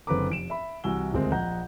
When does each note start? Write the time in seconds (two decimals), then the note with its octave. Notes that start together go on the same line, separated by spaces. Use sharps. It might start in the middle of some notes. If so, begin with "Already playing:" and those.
0.07 F#1 D3 C4 B4 A#5 D6
0.30 F1 D7 E7
0.50 E5 B5
0.84 C2 E3 F#4 G#5 E6 G7
1.13 D#1 D2 G#3 C4 A#4
1.32 A#1 D#5 F#5 A#5 G6